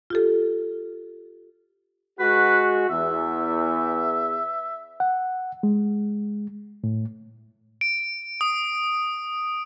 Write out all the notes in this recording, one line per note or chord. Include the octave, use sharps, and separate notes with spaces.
F4 G4 A4
G#3 F#4 B4
E2 E5
F#5
G#3
A2
D7
D#6